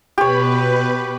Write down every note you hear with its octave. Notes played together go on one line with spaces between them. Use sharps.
B2 G4 B4 C#5 B5